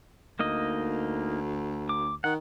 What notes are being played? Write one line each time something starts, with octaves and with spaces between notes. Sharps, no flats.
D2 A#3 D#4 D#5
D6
D#3 F#5